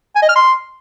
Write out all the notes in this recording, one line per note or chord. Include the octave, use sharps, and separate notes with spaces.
G#5
D#5
F6
C6